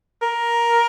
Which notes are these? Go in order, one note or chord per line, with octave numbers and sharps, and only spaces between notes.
A#4